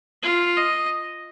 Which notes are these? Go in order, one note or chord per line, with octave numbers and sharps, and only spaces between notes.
F4
D#5